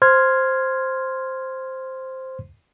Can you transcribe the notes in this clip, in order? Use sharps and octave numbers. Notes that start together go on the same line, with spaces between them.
C5 C6 F6 G#6